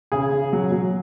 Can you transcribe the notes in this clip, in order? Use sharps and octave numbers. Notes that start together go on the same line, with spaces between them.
C#3 G#4
C#3
F#3
F#3